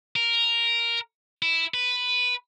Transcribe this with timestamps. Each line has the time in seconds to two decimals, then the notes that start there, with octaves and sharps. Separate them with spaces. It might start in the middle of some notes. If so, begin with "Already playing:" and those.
0.16 A#4
1.42 E4
1.74 B4